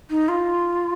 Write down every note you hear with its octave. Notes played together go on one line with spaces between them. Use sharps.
D#4
F4